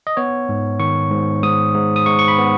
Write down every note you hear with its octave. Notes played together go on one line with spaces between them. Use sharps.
D#5
B3 C#5
G#2
D#3 C#6
G#2
G#2 D#6
G#2
D#6
G#2 C#6
C#6
B5
B3